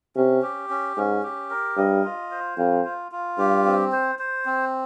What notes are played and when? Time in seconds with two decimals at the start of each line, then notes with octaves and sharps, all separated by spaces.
0.16 C3 C#4
0.42 G4
0.70 C#4
0.97 G#2 C#4
1.23 G4
1.50 A#4
1.77 G2 D#5
2.04 F4
2.31 C5
2.58 F2 F4
2.85 F4
3.12 F4
3.38 G2 G4
3.65 C4
3.92 C5
4.19 C5
4.46 C4